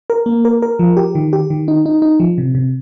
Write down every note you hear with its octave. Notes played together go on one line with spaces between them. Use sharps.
A#4
A#3
A#4
A#4
F3
G4
D#3
G4
D#3
D#4
D#4
D#4
F3
C3
C3